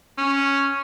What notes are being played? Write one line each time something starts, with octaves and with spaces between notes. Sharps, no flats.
C#4